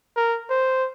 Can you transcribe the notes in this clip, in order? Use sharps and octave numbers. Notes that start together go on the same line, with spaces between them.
A#4
C5